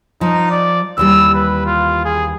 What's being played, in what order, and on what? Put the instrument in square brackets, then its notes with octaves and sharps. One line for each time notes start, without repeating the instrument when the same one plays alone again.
[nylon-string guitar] F3 [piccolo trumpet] D#4
[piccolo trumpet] D5
[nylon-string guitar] D#2 E3 G3 [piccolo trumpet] E6
[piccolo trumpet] B4
F4
G#4